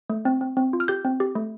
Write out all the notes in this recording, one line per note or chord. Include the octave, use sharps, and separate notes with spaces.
A3
C4
C4
C4
F4
F6
G4 G6
C4
G4
A3